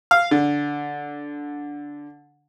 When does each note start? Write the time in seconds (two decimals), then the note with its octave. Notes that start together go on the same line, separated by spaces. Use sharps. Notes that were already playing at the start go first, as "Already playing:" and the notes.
0.11 F5
0.31 D3